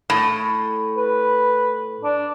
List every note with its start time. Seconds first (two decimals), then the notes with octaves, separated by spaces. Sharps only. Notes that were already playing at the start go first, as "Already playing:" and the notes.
0.10 A2
0.97 B4
2.04 D4